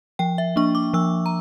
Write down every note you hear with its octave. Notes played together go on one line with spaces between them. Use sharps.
F3 G5
E5
A#3 D4 C#6
D6
F3 E6
A#5